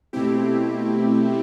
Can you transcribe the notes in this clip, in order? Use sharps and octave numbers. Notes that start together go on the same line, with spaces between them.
B2 A3 C4 E4 G4